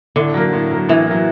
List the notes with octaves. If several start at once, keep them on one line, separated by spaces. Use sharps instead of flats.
A2 D3
F#3 A#3
A2
F#3 A#3
A2 E3
F#3 A#3